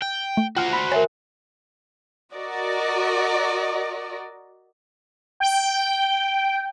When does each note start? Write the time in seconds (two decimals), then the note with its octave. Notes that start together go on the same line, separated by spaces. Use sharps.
0.02 G5
0.37 A3
0.56 F4 F#4 C5 G5 F6
0.73 B5 B6
0.92 A#4 C#5 E5 G#5 A6 A#6
2.34 F#4 A#4 D5 D#5
5.40 G5